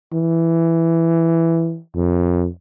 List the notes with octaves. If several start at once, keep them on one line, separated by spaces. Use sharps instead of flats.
E3
F2